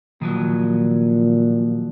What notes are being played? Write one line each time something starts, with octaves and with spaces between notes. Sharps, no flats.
A#2 D#3 F3 F#3